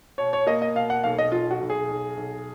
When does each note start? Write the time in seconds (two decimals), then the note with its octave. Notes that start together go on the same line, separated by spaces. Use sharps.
0.18 B2 C#5
0.33 C#5
0.47 A#3 D#5
0.62 D#5
0.75 B2 F5
0.90 F#5
1.04 B1 F5
1.19 D#5
1.32 B1 F4
1.51 F#4
1.61 B1
1.70 G#4
1.89 B1
2.17 B1